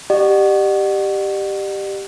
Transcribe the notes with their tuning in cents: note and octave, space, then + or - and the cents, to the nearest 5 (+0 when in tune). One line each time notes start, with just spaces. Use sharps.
G4 +0 D5 +45 F#5 +10